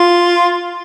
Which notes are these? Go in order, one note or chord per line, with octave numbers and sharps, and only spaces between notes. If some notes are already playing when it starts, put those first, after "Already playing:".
Already playing: F4